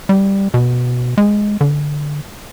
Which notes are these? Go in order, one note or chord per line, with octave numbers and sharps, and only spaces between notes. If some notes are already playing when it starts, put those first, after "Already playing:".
G3
B2
G#3
D3